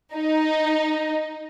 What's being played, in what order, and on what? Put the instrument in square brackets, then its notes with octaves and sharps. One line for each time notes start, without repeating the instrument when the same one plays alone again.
[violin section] D#4